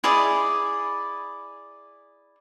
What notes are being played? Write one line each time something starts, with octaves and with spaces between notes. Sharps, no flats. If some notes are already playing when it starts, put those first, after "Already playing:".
E4 G#4 D5 D#5